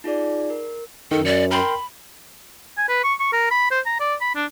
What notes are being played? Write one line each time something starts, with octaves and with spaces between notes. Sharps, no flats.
D#4 F4 G#4 D5
A#4
F#2 D#3 A4
D5 C#7
A#4 G5 B5 C6
G#5
B4
C#6
C#6
A#4
B5
C5
A#5
D5
B5
D4